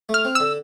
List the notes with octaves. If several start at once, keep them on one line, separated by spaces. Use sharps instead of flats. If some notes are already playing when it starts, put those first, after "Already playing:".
A3 F6
C4
D3 E6